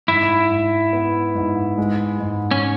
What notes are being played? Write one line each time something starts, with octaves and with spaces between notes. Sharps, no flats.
G#2 E4
G#2
B3
G#2
G#3
G#2
C#4